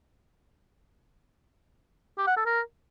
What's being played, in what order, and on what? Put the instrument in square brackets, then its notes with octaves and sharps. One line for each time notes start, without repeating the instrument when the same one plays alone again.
[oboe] G4
F#5
A4
A#4